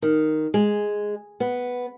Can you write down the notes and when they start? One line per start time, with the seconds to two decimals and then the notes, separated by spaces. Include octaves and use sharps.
0.02 D#3
0.54 G#3
1.40 B3